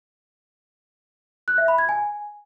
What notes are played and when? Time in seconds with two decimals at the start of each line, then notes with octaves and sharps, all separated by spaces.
1.48 F#6
1.58 E5
1.68 B5
1.78 G#6
1.89 G#5